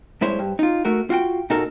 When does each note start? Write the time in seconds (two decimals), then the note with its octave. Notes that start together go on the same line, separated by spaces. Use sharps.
0.21 G2 G#3 E4 C5 C#5
0.39 G2
0.59 D#4 F4
0.85 A3 F#4 A#4
1.10 F4 F#4 F#5 G5
1.50 A#2 D#4 F#4 A4 A#4